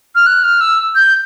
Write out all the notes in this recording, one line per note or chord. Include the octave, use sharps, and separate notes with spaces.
F6
F#6
F6
E6
G6